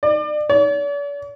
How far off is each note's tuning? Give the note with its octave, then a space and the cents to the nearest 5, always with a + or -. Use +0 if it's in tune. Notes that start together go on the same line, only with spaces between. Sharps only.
D5 +35
D5 -45